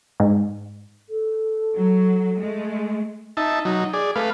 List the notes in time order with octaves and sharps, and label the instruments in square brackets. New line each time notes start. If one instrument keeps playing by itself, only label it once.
[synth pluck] G#2
[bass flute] A4
[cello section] F#3
G#3 A3
[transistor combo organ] D#4 E5 A5
F#3 D#4
G#4 D5
A3 B4 F5